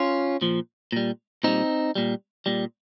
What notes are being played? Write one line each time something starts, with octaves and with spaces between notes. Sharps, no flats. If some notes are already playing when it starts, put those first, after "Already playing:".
Already playing: C#4 F4
A#2 F3
A#2 G3
A#2 G3 C4 D#4
A#2 G3
A#2 G3